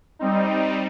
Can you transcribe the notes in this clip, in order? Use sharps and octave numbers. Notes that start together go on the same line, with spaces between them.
G3 C4 D#4